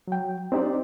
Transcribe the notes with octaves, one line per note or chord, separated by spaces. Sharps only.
F#3 G5
C4 D4 D#4 G4 C5 D5